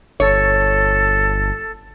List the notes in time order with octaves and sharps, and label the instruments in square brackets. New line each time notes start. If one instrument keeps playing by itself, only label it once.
[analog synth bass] G1 [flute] A4 [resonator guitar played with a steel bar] C#5